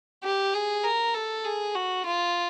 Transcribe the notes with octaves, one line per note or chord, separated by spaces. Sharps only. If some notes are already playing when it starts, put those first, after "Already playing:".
G4
G#4
A#4
A4
G#4
F#4
F4